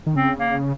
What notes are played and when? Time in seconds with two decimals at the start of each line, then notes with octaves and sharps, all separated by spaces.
0.06 D#3
0.15 C#3 C4
0.39 A#3